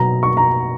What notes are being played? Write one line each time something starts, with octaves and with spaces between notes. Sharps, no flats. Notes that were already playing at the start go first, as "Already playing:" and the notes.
Already playing: B2 F#3 A#5
C#6
A#5